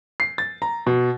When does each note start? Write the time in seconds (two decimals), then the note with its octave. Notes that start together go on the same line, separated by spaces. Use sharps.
0.20 C7
0.38 A6
0.62 A#5
0.86 B2